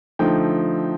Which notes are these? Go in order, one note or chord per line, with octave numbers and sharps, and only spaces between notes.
D3 F3 A3 D#4 G5